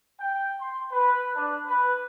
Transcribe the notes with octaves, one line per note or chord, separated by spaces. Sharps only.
G5
C6
B4
D4
B4